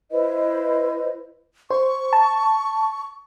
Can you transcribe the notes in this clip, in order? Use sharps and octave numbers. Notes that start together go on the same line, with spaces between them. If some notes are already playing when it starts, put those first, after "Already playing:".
E4 B4 C5 D#5
C5 C#6
A5